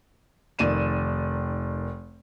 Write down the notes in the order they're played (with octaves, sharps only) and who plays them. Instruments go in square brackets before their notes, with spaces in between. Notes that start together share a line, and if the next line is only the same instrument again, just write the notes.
[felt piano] F1 D#3 D5 D#7 E7